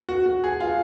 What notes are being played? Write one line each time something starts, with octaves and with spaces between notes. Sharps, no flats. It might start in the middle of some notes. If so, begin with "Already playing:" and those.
F#4
F#4
G#4
F4